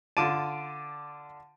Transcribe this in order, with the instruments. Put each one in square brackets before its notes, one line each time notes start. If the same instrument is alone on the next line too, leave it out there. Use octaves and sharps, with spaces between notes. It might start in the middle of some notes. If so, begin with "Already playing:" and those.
[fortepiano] D3 F4 A5 [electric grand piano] D6 D7 D#7